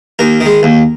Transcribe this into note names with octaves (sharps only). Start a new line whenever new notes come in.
D#2 A#4
D#3
G#3
D#2